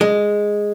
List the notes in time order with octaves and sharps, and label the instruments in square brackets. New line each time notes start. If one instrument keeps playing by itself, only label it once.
[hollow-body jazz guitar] G#3